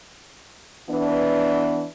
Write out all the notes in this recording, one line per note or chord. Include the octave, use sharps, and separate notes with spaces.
E3 B3 D4